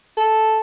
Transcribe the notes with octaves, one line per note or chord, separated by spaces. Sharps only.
A4